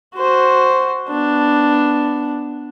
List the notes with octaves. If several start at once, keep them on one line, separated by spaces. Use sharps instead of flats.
F#4 C5
B3 D4